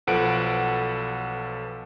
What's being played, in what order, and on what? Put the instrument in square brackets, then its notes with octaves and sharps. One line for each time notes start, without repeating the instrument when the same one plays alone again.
[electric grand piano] B1 F3 A4 B4 F#5 D7